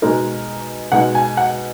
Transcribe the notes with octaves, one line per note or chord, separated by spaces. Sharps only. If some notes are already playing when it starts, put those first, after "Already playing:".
B2 G#3 D#4 A#4
B2 G#3 D#4 F#5
G#5
F#5